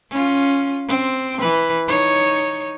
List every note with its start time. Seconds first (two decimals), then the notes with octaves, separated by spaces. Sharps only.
0.11 C#4 F4
0.88 C4
1.38 E3 B4
1.88 D#4 C#5